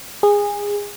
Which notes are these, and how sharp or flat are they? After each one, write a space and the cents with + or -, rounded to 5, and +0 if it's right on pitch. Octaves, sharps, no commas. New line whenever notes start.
G#4 -20